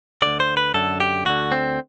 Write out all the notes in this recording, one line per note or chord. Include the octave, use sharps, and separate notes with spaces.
D2 D3 D5
C5
B4
F#2 D3 A4
G4
D2 D3 F#4
C4